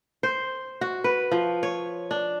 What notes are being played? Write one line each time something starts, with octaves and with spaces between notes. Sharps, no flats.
C5
F#4
B4
F3
C#5
D4